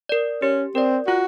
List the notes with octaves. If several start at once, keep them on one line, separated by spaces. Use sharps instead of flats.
A#4 D5
C#4 G4
C4 A#4 D5
F4 F#4